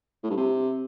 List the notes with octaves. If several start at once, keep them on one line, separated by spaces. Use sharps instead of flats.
A2
G2
C3